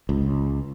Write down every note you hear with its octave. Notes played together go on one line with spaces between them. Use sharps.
C#2